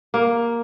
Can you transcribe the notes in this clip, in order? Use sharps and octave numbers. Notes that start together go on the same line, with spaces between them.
A#3